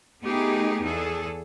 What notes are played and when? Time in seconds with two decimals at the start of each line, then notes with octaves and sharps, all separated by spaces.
0.23 A3 B3 D#4 G4 G#4
0.84 E2 G#4 A4